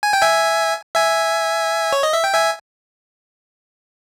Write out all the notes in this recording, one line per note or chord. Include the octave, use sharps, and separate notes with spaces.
G#5
G5
E5 G#5
E5 G#5
C#5
D#5
E5
G5
E5 G#5